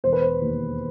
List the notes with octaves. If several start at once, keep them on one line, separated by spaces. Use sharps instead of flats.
E1 C5
B4
C5
D#2